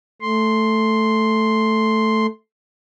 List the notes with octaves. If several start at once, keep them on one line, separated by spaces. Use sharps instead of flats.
A3 C6